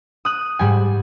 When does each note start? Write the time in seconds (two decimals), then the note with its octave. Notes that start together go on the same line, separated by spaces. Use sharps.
0.25 D#6 F#6
0.59 G#2 G3 G#5